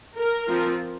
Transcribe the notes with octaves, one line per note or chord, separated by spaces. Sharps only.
A#4
F3 C4 F4